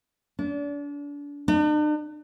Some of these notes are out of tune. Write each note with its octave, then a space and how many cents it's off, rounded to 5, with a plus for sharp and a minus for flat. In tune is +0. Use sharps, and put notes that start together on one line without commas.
D4 -35
D4 +45